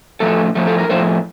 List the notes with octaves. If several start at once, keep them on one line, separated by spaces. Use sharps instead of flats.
A2 F3 A3 A4
A2 F3 A3
A4
A#4
A2 F3 A3 C5